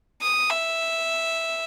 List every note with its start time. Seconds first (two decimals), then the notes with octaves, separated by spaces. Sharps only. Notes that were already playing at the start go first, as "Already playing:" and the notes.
0.22 D#6
0.50 E5